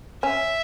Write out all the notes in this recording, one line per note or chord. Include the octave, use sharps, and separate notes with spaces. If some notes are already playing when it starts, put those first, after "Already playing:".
C#4 E5